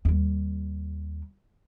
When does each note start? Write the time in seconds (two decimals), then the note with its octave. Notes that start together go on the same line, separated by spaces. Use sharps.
0.05 D#2 G3